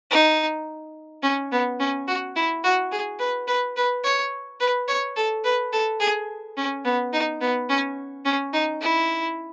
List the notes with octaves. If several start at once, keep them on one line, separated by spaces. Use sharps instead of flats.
D#4
C#4
B3
C#4
F#4
E4
F#4
G#4
B4
B4
B4
C#5
B4
C#5
A4
B4
A4
G#4
C#4
B3
D#4
B3
C#4
C#4
D#4
E4